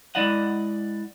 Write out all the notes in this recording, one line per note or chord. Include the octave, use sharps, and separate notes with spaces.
G#3 E4 D5 D#5 F#5